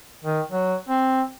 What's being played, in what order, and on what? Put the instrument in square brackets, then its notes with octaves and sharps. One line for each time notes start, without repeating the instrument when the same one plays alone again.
[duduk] D#3
F#3
C4